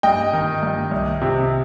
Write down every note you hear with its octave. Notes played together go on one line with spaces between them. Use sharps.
G2 D#5 G5
D#3
G2
C2
C3